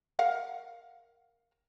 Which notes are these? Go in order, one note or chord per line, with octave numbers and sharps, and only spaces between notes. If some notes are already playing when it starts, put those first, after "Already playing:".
A#4 F5 F#5